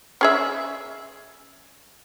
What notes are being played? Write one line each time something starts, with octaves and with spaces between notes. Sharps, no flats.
C#4 G#4 E5